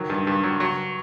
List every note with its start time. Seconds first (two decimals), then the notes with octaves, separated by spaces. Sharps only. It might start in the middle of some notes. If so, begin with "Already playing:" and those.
Already playing: D#3 F#3
0.10 G2
0.27 G2
0.43 F#3
0.60 F#3